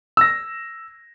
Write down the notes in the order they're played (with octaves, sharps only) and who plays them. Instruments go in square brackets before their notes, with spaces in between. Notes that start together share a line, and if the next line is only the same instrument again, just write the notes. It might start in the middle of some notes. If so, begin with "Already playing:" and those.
[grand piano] E6 A#6